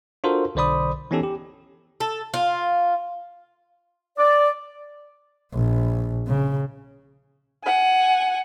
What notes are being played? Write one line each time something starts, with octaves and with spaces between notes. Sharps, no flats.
D4 F4 F#4 A4 A#4 C5
B1 D3 C5 D5 B5 D#6
E3 B3 C#4 D#4 G4 A4
G4
A4
F4
D5
A#1
C#3
F#5 G#5